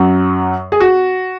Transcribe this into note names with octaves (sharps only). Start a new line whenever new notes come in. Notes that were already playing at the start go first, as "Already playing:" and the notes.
Already playing: F#2 F#3
G#4
F#4